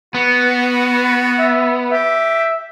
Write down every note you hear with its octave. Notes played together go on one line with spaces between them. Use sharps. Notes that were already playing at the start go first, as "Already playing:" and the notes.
B3 F#4
E5
G4 E5